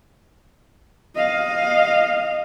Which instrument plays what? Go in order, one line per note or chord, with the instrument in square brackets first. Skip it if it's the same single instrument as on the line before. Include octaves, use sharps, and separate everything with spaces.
[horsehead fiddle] D#5 F5